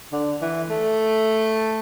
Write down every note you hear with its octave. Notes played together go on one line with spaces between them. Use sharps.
D3
E3
A3